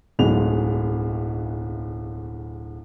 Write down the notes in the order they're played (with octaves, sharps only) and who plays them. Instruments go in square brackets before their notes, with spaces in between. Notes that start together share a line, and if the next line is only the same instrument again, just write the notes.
[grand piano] D1 B1 B2 G#3 F7